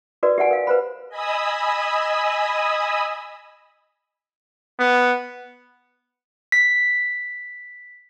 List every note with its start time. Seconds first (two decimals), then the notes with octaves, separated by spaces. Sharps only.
0.23 F#4 A#4 B4 D5
0.38 G4 D5 F#5 G#5
0.51 A#4 F5
0.67 B4 C5 B5
1.09 D#5 G#5 B5 D#6 E6
4.79 B3
6.52 B6